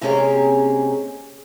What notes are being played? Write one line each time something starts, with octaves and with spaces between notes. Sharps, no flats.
C3 G#3 A#3 C#4 G4 G#4